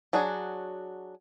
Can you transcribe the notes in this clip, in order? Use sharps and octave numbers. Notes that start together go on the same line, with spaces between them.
F#3 D4 F#4 G#4